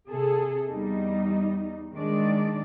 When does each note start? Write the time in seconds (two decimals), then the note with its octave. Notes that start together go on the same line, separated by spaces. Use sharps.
0.10 C3 G#4 A4
0.70 E2 G3 D#4
1.95 D#3 G#3 D4 D5